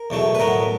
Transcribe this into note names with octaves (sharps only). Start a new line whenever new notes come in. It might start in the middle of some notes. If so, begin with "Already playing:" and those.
Already playing: A#4
E2 B2 F#3 A3
B4
A2 F#3 B3 A#4